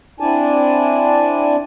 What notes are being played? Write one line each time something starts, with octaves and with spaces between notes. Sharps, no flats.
C4 D4 E4 D5 G#5 A5